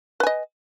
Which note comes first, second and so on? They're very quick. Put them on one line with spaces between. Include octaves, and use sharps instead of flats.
B4 G#5 D#5